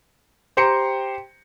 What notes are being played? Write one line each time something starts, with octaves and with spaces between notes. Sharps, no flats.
G4 C5 G5 A#5 C6 C#7